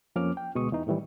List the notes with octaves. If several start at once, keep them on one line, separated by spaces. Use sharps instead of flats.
F2 F3 A#3 C#4 D6 F6
G5
D2 B2 G#3 C#6 D#6
E2 E3 D#4
A2 D#3 E3 G3